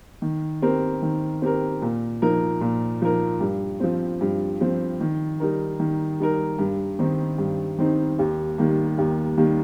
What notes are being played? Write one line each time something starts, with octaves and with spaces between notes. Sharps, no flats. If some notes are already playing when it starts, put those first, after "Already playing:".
D#3
C4 G4 A#4
D#3
C4 G4 A#4
A#2
F3 D#4 A#4
A#2
F3 D#4 A#4
G2
F3 C4
G2
F3 C4
D#3
G3 D#4 A#4
D#3
G3 D#4 A#4
G2
D#3 C4 D#4
G2
D#3 C4 D#4
D#2
D#3 G3 A#3
D#2
D#3 G3 A#3